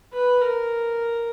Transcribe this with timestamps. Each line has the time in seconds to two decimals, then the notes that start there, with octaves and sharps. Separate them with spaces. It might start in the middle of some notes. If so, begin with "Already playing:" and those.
0.13 B4
0.42 A#4